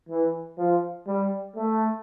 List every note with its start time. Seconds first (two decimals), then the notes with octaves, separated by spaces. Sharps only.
0.09 E3
0.58 F3
1.07 G3
1.56 A3